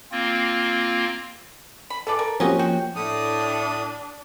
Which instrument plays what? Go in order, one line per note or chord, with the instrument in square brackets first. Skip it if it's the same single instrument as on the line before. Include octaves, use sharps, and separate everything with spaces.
[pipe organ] A#3 C4 F4
[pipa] B5
[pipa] E3 B4 D5 [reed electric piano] A4 A5
[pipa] A#4
[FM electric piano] F3 A#3 [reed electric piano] C4 F#4 G4 [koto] C#4 D#5
[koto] F#4 [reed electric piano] G5
[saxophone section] A2 [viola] D4 [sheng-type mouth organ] D#6